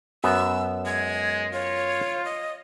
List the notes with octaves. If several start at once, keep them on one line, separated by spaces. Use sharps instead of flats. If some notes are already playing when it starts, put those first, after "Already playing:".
F#2 B3 F#4 E6
G#3 G#6
F4 C#5
D#5